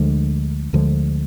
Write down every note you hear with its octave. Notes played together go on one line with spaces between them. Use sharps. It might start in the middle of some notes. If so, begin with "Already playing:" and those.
Already playing: D2 D3 F3 G#3
D2 D3 F3 G#3